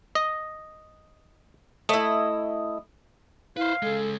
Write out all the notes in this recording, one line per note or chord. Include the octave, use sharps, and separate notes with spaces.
D#5
A3 E4 D#5
E4 B4 C5 F5
C#3 G#3 A4